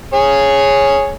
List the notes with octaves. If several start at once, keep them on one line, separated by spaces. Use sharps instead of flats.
G#4 C#5